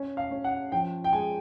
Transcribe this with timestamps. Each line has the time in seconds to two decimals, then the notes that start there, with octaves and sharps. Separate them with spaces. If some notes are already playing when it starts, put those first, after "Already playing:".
Already playing: C#4
0.17 F5
0.31 C#4
0.44 F#5
0.72 F3 G5
1.04 G5
1.13 G#3 G#5